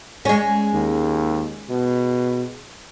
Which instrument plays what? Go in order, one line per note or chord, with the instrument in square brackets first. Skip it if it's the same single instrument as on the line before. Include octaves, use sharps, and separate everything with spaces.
[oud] G#3 C#4
[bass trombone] D#2
B2